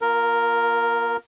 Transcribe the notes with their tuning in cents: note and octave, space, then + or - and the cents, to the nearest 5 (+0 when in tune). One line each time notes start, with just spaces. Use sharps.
A#3 +35 F4 +0 A#4 +0